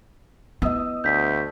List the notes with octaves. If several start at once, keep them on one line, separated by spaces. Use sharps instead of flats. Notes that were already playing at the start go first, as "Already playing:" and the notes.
B3 E4 D#5 D#6 E6
D2 G6 B6